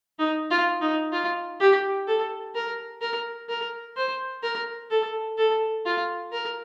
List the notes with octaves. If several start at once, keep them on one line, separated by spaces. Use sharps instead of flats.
D#4
F4
D#4
F4
G4
A4
A#4
A#4
A#4
C5
A#4
A4
A4
F4
A#4